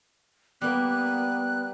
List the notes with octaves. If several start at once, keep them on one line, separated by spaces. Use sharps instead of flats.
G3 A#3 B3 F#6